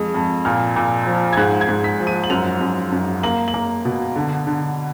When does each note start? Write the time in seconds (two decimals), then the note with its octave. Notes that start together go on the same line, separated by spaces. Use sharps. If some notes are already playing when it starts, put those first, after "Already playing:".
Already playing: F2 G#3 D#6
0.14 F2
0.45 A#2 F6
0.76 A#2
1.06 F3
1.33 G#6
1.37 G#2 F#6
1.61 G#6
1.69 G#2
1.84 B6
2.00 F3
2.07 D#7
2.24 F#7
2.30 F#2 F7
2.61 F#2
2.92 F#2
3.23 A#3 F#7
3.48 F#7
3.54 A#3
3.85 B2
4.16 D3
4.47 D3